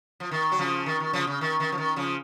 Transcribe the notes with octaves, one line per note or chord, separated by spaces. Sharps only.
F3
D#3
F#3
C#3 F3
D#3
D#3
C#3 F3
C#3
D#3
D#3
F3
D#3
C#3 F3